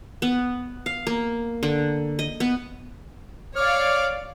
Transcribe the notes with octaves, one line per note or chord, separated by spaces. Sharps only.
B3
F5
A#3
D3
D#5
B3
C#5 D5 F5 D6 F6